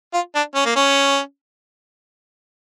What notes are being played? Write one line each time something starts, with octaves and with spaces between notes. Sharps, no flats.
F4
D4
C#4
A#3
C#4